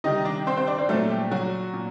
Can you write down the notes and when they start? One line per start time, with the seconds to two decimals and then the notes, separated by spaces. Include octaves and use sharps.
0.04 C3 D#3 G3 D#4 D#5
0.25 D4 D5
0.47 C4 C5
0.57 C4 C5
0.67 D4 D5
0.78 C4 C5
0.89 A#2 F#3 A3 A4
1.10 G3 G4
1.31 F#3 F#4
1.73 A#2